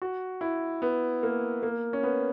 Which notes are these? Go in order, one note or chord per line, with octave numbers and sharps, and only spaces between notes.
F#4
E4
B3
A#3
A#3
C#4
B3